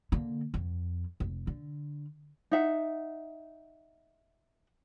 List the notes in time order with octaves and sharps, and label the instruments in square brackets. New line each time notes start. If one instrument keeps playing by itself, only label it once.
[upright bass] D3 A#3
F2
F1
D3
[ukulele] D#4 E5 F#5